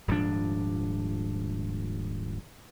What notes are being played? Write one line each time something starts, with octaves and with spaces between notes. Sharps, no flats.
D#1 G#2 F3 D4